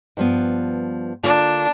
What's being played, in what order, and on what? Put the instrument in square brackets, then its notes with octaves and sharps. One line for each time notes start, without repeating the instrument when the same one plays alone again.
[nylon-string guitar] G2 F3 B3
[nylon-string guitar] D3 A#3 F4 [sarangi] D4